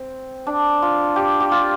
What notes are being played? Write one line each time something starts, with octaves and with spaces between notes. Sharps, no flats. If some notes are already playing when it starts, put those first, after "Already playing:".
Already playing: C4
D4
F4
G4
G4
F4